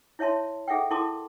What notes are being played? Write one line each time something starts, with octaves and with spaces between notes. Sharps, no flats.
E4 C#5 E5 A5 C6
G#4 A4 E5 F#5 G5
E4 A4 A#4 A5 C6 D6